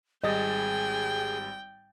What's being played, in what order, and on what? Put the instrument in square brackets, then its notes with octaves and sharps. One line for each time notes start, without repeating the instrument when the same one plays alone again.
[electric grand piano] G#1 G3 A6 [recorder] G#4 [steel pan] D#5 [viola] G5